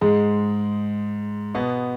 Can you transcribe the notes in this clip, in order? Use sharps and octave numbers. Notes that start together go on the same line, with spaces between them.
G#2 G#3
B2 B3